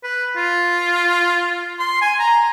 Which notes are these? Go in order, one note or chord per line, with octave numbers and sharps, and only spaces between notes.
B4
F4
C6
G#5
A#5